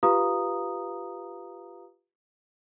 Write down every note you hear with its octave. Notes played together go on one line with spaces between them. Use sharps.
F4 G4 B4 F5 A#5 D#6